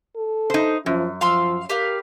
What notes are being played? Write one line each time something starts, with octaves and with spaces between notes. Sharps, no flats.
A4
D#4 C5
F#2 F3
F3 F5 C6 E6
G4 A#4 B4 F5